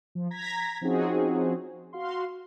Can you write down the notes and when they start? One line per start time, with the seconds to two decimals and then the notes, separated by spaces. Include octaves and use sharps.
0.15 F3
0.31 A#5 G#6 A#6 B6
0.81 F3 C4 C#4 D#4 F#4 G#4
1.93 F#4 F5 C6